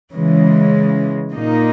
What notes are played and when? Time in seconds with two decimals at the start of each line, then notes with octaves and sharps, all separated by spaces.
0.14 C#3 E3 G#3
1.33 A#2 A#3 D#4